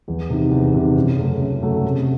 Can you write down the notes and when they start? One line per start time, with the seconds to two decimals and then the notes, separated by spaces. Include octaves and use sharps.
0.08 E2
0.30 C3 D#3
0.51 E2
0.74 C3 D#3
0.96 F#2
1.17 C#3 F#3 A3
1.39 F#2
1.62 C#3 F#3 A3
1.84 C3